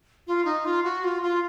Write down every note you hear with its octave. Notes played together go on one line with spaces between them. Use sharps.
F4
D#4
F4
F#4
F4
F4